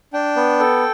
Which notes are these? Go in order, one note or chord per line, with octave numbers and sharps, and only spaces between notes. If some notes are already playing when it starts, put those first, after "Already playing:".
D4 G5
B3
A4